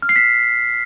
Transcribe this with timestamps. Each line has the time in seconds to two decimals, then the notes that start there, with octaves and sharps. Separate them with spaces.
0.02 F6
0.09 C7
0.16 B6